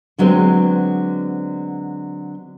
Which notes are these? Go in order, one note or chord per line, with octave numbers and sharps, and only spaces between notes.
D3 F#3 G#3 B3 C4